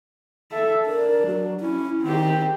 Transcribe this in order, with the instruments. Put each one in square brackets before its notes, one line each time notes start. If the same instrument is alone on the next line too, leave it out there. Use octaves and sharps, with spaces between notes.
[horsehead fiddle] A4 E5
[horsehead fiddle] D4 [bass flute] A#4
[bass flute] F#3
[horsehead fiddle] C#4 [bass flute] E4
[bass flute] D#3 [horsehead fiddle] C4 G4